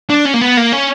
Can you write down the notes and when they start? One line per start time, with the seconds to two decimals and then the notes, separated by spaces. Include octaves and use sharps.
0.10 D4
0.25 C#4
0.34 A#3
0.41 B3
0.57 A#3
0.72 C#4